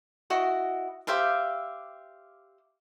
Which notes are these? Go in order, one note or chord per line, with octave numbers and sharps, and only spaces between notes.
E4 F#4 D#5
G4 C5 E5 F5